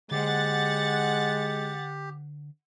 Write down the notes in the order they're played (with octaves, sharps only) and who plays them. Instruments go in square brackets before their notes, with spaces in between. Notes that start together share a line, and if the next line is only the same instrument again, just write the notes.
[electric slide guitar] D3 C5 [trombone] G#3 [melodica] G4 [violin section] F#5 A6